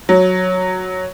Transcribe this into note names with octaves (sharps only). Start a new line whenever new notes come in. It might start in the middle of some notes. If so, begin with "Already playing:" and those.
F#3